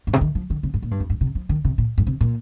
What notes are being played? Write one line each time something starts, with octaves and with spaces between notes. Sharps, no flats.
G2
C3
D#3
F3
D#3
C3
G2
A#2
G2
F2
G2
C3
F3
D#3
C3
A#2
G2
C3
A#2